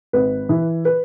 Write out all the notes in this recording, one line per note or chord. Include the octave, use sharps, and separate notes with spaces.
G#1 B4
E3
B4